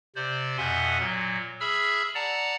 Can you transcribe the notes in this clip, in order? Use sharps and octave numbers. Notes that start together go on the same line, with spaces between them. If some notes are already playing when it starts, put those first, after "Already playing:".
C3 C5 D5
F2 B2 E5 F#5 G#5 C6
A#2 F#3
G#4 E5 B5 E6 F6
D5 F#5 A5 A#5